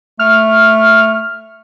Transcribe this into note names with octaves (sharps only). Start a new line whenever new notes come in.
A3 F6